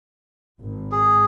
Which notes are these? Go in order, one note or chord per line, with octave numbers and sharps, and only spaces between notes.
G#1
G#4